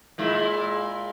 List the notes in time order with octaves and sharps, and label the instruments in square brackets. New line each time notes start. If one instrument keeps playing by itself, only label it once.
[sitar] A#2 G#3 E4